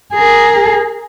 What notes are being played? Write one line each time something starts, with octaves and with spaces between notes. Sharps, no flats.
G#4 A#4